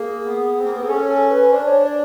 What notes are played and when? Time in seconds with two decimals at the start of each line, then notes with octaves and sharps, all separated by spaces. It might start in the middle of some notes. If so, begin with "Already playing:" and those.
Already playing: A#3 G#4
0.26 B3
0.58 C4
0.65 A#3
0.74 B3
0.81 C4 G#4
0.88 C#4 A4
1.09 A4
1.31 B4
1.52 D4 C5
1.67 C#5
1.83 D5